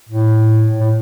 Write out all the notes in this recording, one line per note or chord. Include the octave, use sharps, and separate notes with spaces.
A2
A2